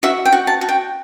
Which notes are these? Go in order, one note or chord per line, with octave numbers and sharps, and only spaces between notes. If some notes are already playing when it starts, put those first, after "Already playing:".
F#4 E5
G5
F#4
A5
F#4
G5